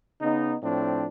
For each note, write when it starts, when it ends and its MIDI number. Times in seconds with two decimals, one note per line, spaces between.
0.21 0.55 49
0.21 0.55 59
0.21 0.55 63
0.63 1.06 45
0.63 1.06 53
0.63 1.06 60
0.63 1.06 62